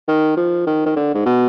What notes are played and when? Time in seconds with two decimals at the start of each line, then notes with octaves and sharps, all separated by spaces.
0.08 D#3
0.37 F3
0.67 D#3
0.86 D#3
0.96 D3
1.14 G#2
1.26 B2